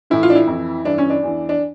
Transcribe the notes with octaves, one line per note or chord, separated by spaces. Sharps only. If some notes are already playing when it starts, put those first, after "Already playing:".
A2 E3 E4
F4
D4
E4
F2 E3
G2 E3 D4
C#4
D4
E2 E3
D4